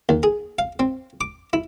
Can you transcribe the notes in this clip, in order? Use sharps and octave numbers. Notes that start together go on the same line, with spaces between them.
D#2
G#4
F5
C4
D6
E4